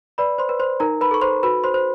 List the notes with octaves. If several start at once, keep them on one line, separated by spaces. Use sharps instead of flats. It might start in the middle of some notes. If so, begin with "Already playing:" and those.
B4 D5 B5
C5 C6
B4
C5 C6
D#4 A#4 A#5
B4 B5
A4 C#6
C5 C6
F#4 B4 B5
C5 C6
C5